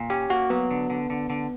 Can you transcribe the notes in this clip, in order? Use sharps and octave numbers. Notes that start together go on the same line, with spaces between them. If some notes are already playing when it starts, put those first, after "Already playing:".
Already playing: A#2
C#4 G4
A#3 F#4
F#3 B3
D3
D3
D3
D3